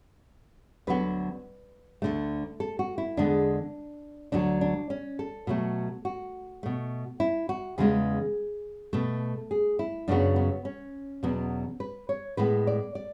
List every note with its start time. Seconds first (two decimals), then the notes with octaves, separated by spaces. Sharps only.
0.87 D2 D3 F#3 B3 B4
2.02 D2 D3 A3
2.60 A4
2.79 F#4
2.98 E4
3.17 E2 D3 G#3 B3 D4
4.32 D2 D3 F#3 D4
4.61 D4
4.90 C#4
5.19 A4
5.47 B2 F#3 A3
6.05 F#4
6.63 B2 A3
7.20 E4
7.49 F#4
7.78 E2 C#3 G#3 B3 G#4
8.93 B2 A3 A4
9.51 G#4
9.79 E4
10.08 F#2 C#3 F#3 B3 D4
10.36 B3
10.65 C#4
11.23 E2 B2 F#3 B3
11.80 B4
12.09 C#5
12.37 A2 G#3 B3 B4
12.67 D5
12.95 D5